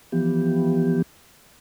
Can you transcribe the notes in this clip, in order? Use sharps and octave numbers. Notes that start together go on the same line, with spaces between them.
E3 F3 B3 G4